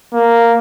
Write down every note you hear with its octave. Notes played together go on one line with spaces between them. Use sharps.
A#3